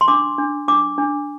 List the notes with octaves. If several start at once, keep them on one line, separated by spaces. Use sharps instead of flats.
C6
D4 D6
D4
D4 D6
D4